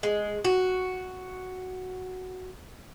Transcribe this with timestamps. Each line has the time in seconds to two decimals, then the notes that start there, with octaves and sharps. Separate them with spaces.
0.03 G#3
0.45 F#4